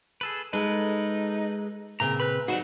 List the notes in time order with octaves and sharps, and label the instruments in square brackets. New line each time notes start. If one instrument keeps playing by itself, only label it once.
[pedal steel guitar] G#4 A4 B4
[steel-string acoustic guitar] G#3 A4 [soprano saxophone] D#4 [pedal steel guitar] B4
[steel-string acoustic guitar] A#2 C#3 C4 [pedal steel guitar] A#5
[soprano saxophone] B4 [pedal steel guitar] B5 F#6
[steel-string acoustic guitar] F#3 D#4 [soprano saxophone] F#4 [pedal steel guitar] G#4 C5 D5